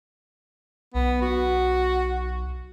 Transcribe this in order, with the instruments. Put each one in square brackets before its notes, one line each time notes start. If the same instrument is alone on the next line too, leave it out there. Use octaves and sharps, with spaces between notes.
[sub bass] B1 [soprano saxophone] B3
[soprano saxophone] F#4